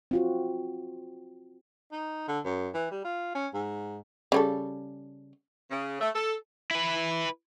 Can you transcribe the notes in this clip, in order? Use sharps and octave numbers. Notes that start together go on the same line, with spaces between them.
C4 F4 F#4
D#4
D3
F#2
E3
G3
F4
C#4
G#2
C#3 G3 A4
C#3
A3
A4
E4 B4